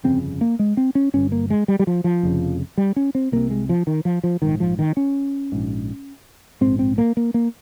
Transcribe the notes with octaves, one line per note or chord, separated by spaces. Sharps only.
G1 F2 C#3 C4
A#3
G#3
C4
C#4
G1 G2 C#4
A#3
G#3
G3
G3
F3
F3
F1 F2 C#3
G3
C#4
C4
C2 C3 A#3
G#3
F3
D#3
F3
F3
A#1 G#2 D#3
F3
D#3
C#4
A#1 G#2
A#1 G#2 C4
C4
A#3
A#3
A#3